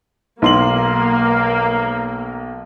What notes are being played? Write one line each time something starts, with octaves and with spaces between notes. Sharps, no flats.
B1 A#3 C6 F#7